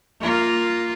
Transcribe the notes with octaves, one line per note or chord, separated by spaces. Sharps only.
A#3 F4